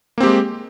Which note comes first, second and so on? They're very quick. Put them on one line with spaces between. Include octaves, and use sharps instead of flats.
A#3 C4 G4 G#3